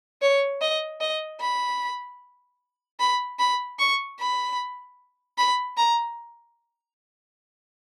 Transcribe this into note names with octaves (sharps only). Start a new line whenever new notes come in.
C#5
D#5
D#5
B5
B5
B5
C#6
B5
B5
A#5